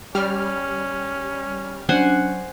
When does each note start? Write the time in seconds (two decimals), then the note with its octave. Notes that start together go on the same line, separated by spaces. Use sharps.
0.15 G3 C#4 F6
1.89 F#3 C#4 D4 C5 F#5 G#5